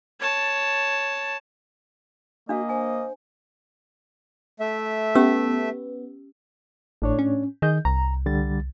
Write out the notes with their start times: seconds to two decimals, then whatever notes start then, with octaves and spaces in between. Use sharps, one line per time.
0.20 C#5 A5
2.49 A#3 D4 F#4 D#5 F5
2.69 C5 G#5
4.60 A3 E5
5.15 B3 C#4 G4 E6
7.02 G#1 A2 D4 C#5
7.19 C#4
7.62 D#3 G#4 D#5 G6
7.85 C2 A#5
8.26 D3 G3 A6